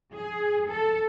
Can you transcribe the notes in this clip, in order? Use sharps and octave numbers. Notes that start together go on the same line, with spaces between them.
G#4
A4